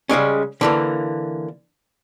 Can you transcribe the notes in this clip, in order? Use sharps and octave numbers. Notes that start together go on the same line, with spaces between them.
C#3 G3 G#3 C#4
D3 E3 A#3